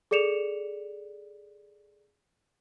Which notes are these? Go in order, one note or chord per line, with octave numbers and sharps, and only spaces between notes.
G#4 A4 D5 C#7 E7 F7